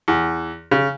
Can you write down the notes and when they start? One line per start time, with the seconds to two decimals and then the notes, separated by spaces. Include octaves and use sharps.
0.08 E2
0.71 C#3